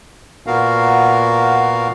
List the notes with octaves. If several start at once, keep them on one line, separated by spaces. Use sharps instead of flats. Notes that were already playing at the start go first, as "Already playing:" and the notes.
A#2 B3 F#4 A#4 F5